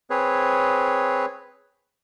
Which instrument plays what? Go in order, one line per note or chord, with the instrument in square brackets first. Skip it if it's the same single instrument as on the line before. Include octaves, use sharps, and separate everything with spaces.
[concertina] C4 G#4 B4 C#5